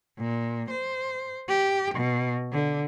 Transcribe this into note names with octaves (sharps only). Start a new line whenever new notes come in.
A#2
C5
G4
B2
D3